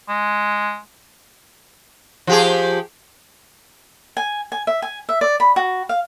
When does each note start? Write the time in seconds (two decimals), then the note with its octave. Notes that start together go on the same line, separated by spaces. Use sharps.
0.09 G#3
2.27 F3 G4 G#4
4.17 G#5
4.52 G#5
4.67 E5
4.82 G#5
5.09 E5
5.21 D5
5.40 B5
5.56 F#4
5.89 F5